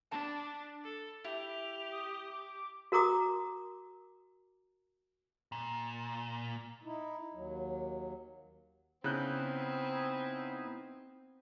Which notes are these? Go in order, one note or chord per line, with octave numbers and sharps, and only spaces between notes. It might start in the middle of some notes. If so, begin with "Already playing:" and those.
D4 A5 B5
A4
E4 G4 F7
D#6
D6
F#4 A#4 A#5 D6 D#6
A#2
D#4 E4
D#2 F#3
C#3 B3 C4 D#4 E4 F#6 G6